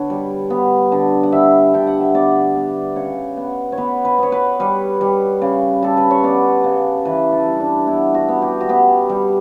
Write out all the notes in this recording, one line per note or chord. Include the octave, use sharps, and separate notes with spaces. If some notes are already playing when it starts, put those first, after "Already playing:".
Already playing: D3 B3 A4 B4 C#5
G3
B3
D3
F#5
G3 E5
D3 G5
F#5
E5
B3 D5
B3
C#3 C#5
B3
C#5
B3 B4
B4
B3 C#5
B4
G3 B4
G3
C#3
G3 A4
B4
C#5
B3 D5
C#3
E3 B4
A4
G3
D4
B3 E4
F#4
B3
G4
F#4
B3 G4
G3